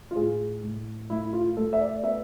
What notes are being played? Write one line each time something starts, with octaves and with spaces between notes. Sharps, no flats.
F4
A2 G#4
A2
A3 E4
F4
A3 A4
E5
D5
B3 E5